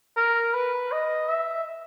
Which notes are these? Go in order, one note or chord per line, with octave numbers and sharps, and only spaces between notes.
A#4
B4
D#5
E5